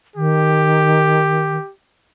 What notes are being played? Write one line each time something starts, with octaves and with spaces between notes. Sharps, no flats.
D#3 G4